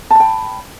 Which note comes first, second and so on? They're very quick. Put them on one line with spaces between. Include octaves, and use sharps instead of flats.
A5 B5 G5